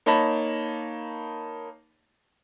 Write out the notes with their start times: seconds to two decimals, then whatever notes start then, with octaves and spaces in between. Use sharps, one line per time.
0.06 A#3 D#4 C#5 A5 B5 A#6